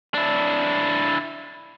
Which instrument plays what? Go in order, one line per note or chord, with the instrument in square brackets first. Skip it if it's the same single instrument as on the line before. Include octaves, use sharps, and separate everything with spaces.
[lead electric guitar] D4 E4